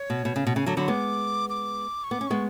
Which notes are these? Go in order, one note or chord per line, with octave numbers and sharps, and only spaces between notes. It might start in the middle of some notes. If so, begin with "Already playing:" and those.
Already playing: C#5
B2
B2
C#3
B2
C#3 G#5
D3 F#3 A5
D3 F#3 B5
G#3 B3 D6
D6
C#6
B3 D6
C#4
G#3 B3 C#6